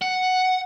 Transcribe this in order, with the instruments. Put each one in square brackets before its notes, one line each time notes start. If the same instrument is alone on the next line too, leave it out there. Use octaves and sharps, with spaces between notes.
[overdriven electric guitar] F#5